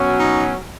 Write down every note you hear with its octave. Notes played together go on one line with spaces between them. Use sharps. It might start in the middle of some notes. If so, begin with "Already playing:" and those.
Already playing: B2 F#3 C#4
D#4